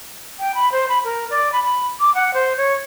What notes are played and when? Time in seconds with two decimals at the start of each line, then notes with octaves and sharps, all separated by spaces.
0.39 G5
0.55 B5
0.72 C5
0.89 B5
1.05 A#4
1.30 D5
1.52 B5
1.64 B5
2.00 D6
2.15 F#5
2.34 C5
2.57 C#5